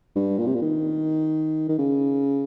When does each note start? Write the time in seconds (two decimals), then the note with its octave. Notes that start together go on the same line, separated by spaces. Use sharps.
0.16 G2
0.38 A#2
0.47 C3
0.54 A#2
0.62 D#3
1.69 D#3
1.78 C#3